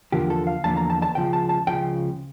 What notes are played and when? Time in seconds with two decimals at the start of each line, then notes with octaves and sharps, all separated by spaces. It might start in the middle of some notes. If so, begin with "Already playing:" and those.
0.12 E2 D3 F3 A#3 G4
0.30 A4
0.47 F5
0.64 E2 D3 F3 A#3 A5
0.77 A#5
0.90 A5
1.02 A5
1.15 C#2 C#3 F3 G5
1.33 A5
1.49 A5
1.67 C#2 C#3 F3 G5